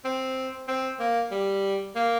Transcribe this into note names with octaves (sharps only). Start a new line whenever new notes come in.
C4
C4
A#3
G3
A#3